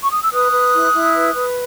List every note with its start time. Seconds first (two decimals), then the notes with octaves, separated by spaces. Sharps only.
0.02 C#6
0.12 D#6
0.22 E6
0.32 B4 D#6 F#6
0.53 B4
0.74 E4
0.93 E4
1.15 B4
1.35 B4